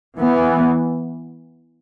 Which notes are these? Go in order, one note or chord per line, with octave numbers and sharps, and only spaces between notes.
E3 B3